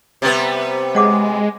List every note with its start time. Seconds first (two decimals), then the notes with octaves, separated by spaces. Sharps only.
0.22 C3 G3 B3
0.95 G#3 C#5 F#5 D6